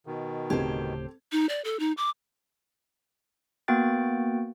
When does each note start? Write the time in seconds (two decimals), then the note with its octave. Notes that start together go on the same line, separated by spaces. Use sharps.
0.06 B2 D#3
0.50 D1 C#3 A3 C4 G4 A4 C5 G#6
1.32 D#4
1.49 D5
1.65 A4
1.79 D#4
1.97 D6
3.68 A#3 B3 F#4 G5 F#6 A6